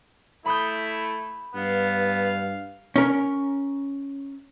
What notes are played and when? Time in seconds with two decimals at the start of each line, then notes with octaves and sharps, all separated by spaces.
0.46 A3 E4 B5 D#6 G6
1.55 G2 B3 F5
2.96 C#4 A#4